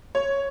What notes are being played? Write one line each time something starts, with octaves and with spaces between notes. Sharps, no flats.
C#5